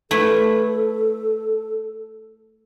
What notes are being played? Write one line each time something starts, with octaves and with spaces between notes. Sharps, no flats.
A3 E4 A4 B4